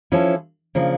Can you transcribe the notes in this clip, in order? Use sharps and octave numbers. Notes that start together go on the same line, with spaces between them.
F3 C#4 E4 A4
C#3 F3 A#3 D4